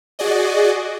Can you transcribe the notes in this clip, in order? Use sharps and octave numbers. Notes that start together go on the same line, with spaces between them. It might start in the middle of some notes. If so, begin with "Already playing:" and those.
F#4 G#4 D5 D#5